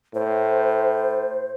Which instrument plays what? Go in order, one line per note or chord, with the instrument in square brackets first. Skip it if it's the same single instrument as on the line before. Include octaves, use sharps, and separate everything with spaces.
[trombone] A2 [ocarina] C5